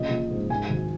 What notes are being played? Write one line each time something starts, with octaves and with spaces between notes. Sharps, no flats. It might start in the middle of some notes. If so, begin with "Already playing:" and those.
Already playing: A#1 C#3 D#5
A#1
G#2
G#2 G#5
G#1